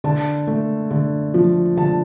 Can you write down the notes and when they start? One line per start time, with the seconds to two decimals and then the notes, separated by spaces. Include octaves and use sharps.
0.04 D3 A5
0.47 A3
0.91 D3
1.34 F3
1.77 D3 A5